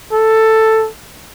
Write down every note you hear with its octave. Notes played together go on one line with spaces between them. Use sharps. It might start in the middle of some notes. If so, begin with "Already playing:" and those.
A4